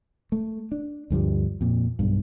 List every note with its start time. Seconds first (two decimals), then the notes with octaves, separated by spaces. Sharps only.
0.32 A3
0.72 D4
1.10 D2 G2 F3 G3
1.61 F2 A#2
1.99 B1 G2